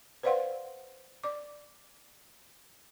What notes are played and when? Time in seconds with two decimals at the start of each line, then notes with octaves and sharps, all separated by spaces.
0.23 B4 C5 D5 F5 F#5 C6
1.24 D5 D6